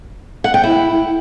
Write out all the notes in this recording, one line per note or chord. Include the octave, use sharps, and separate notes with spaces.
F#5
G5
E4